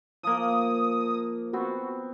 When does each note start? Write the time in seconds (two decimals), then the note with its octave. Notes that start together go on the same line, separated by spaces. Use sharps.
0.23 F3 A#3 D#6
1.53 B3 C4 F#4